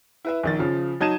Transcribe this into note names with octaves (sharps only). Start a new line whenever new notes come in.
E4 B4 E5
A#1 D#3 A6
C#3 F3
F#3 D#4 A5 G#6 D#7 E7